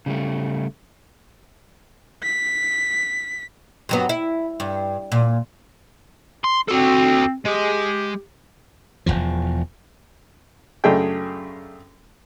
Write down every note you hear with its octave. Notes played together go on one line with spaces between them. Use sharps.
C#3 G3 A3
B6
G2 F#3 B3
E4
G2
A#2
C6
C4 F#4 A4
G#3 G4
E1 A#1 E2 F3
F#2 C#3 A3 D4 G#4 G5